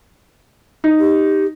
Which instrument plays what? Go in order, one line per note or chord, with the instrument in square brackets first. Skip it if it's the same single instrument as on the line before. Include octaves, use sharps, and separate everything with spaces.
[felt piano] D#4
[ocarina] G4